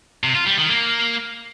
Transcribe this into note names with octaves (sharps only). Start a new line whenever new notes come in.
C3
F4
G3
D#3
A#3